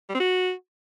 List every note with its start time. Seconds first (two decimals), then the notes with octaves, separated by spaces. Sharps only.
0.09 G3
0.15 C4
0.20 F#4